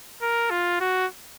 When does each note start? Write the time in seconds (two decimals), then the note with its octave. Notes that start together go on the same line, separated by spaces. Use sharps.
0.22 A#4
0.50 F4
0.80 F#4